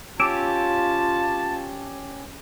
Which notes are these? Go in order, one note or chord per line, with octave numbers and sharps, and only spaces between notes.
C#4 F4 G4 A5 D6 E6